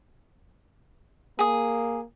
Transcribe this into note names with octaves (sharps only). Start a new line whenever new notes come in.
A#3 G#4 D#6